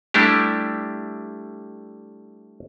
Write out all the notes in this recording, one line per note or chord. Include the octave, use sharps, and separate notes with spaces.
G3 A3 D4 E4 G4